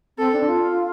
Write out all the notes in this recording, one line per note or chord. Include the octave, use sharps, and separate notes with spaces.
C4 A4
D4
F4